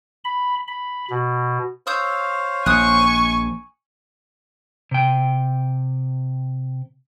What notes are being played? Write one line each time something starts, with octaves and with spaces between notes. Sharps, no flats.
B5
B5
B2
C5 C#5 F5 D#6 E6 G6
A#1 G#5 C#6 D#6 F#6
C3 G5